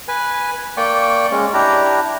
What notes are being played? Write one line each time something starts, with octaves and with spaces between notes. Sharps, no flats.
B4 G#5
A#3 D5 G5 C#6
G#3 C#4
D4 E4 G4 A#5